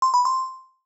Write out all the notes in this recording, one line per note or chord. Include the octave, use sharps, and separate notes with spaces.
C6
B5
C6